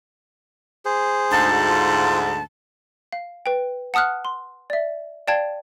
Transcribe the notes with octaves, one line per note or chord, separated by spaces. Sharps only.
G#4 C5
D2 G#2 A5
F4
F5
B4 G5
F#5 A5 D#6 F6 F#6
C6
D5 E5
D5 F5 G5 A5 G#6